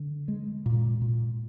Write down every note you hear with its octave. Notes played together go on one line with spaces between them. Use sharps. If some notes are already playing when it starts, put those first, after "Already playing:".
Already playing: D3
G#3
A#2
A#2